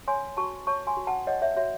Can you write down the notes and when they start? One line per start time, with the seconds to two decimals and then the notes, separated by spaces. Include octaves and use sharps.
0.08 C#5 G#5 C6
0.37 F#4 A5 C#6
0.67 C#5 A5 C#6
0.87 G#5 C6
0.97 F#4
1.07 F#5 A5
1.27 C#5 D#5 F#5
1.42 C#5 E5
1.57 F#4 C#5 E5